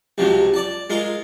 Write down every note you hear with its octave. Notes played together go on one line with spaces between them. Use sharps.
C#2 C3 F3 F#3
D5 A5
G#3 F4 A#4